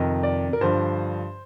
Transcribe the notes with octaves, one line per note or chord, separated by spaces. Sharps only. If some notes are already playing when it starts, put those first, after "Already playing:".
Already playing: F2 C3 D#3 D#5
D5
A#4
G2 D3 F3 C5